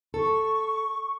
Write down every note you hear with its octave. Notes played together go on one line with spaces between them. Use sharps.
A4 C#6